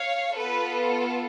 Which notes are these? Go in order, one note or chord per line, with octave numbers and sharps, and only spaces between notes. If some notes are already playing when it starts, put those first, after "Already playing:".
Already playing: C#5 F5
B3 F4 A4 B4